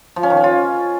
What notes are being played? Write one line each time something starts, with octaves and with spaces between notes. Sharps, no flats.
F3
C#4
D#3
C#4
F4